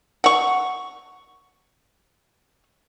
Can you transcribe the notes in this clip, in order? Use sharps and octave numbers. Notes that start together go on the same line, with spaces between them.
F#5 C#6